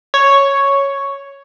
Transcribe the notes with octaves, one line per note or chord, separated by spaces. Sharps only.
C#5